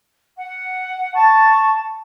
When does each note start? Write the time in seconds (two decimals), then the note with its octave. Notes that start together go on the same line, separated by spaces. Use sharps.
0.37 F#5
1.15 A5 C#6